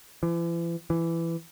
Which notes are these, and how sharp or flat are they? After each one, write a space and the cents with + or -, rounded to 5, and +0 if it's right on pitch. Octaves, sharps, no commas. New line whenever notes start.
E3 +40
E3 +15